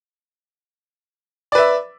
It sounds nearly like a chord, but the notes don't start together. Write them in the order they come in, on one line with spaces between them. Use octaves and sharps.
D5 B4 E5